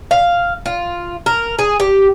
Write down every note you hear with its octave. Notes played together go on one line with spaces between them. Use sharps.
F5
F4
A#4
G#4
G4